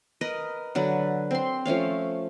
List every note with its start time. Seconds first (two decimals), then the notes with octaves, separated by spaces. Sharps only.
0.21 A#4 B4 D#5
0.75 D3 F#3 B4
1.31 C4 C6
1.65 F3 A3 C#4 F5